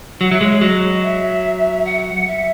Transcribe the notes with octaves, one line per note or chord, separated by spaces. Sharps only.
F#3 F#5
F#3 E5
G#3 C#5
C#5
F#3 D#5
E5
F#5
E5